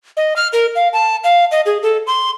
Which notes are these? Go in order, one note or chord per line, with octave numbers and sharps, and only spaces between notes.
D#5
F6
A#4
F5
A5
F5
D#5
G#4
A4
C6